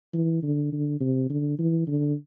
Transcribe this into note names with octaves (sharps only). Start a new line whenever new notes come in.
E3
D3
D3
C3
D3
E3
D3